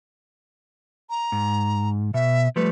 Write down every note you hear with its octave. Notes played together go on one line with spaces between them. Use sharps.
A#5
G#2
B2 E5
F3 G3 A3 B4